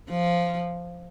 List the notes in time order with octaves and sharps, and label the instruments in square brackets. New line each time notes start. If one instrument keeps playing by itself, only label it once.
[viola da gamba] F3